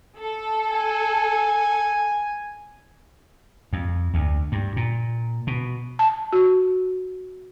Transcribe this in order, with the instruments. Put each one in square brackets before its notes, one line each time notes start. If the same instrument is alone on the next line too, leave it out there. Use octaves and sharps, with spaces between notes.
[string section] A4
[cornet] G#5
[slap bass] F2
D2
G2
A#2
B2
[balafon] A5
F#4